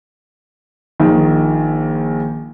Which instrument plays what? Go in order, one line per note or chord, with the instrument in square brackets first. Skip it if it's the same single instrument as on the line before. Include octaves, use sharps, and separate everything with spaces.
[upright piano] A#1 D#3